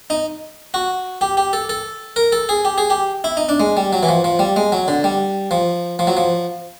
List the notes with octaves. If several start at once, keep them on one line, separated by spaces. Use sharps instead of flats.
D#4
F#4
G4
G4
A4
A4
A#4
A4
G#4
G4
G#4
G4
E4
D#4
D4
G#3
G3
F#3
E3
F3
F3
G3
G#3
F#3
D3
G3
F3
F3
F#3
F3